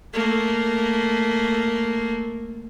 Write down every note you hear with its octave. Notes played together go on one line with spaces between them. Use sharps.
A3 A#3